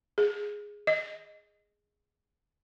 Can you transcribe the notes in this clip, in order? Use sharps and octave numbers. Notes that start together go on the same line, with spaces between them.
G#4
D#5